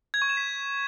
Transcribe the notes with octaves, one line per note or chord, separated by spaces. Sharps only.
G#6
C#6
E7
B6